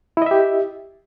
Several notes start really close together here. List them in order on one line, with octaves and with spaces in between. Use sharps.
E4 D#5 E5 G4